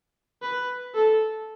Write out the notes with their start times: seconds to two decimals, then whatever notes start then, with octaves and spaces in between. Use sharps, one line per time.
0.42 B4
0.95 A4